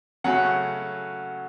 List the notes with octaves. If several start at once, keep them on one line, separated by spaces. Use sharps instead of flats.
C#3 F#3 A3 C#4 F#5